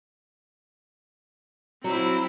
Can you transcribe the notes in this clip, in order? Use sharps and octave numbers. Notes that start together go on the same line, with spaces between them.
F#3 C4 E4